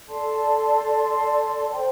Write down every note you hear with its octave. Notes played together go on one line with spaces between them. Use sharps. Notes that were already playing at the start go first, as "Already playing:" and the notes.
A4 D5 A5 C6
C5 G5 C6